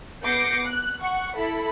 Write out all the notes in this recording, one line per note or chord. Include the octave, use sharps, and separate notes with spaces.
B3 D6 G6 A#6 C7 C#7
F#6
F#5 C#6
E4 A4 B5